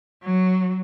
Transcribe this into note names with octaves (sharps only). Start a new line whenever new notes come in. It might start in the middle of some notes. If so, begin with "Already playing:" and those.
F#3